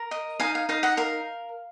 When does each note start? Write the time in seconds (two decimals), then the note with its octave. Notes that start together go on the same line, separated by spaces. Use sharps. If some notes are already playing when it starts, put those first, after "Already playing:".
Already playing: A#4
0.11 D#5
0.40 D#4 F5 G#5
0.55 F5
0.69 D#4 F5
0.83 D#5 F#5
0.97 A#4 F5